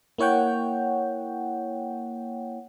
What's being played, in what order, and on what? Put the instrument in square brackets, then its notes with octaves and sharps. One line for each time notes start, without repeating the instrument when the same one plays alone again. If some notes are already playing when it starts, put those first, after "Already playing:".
[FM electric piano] A#3 E4 C#5 F#5 G5